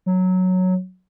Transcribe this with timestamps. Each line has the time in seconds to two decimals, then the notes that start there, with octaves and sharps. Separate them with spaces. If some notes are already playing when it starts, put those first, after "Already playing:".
0.06 F#3